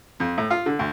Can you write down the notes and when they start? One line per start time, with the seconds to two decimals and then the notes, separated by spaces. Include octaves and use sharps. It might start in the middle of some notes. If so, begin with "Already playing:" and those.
0.20 F2
0.38 A2
0.50 F4
0.66 D3
0.79 D2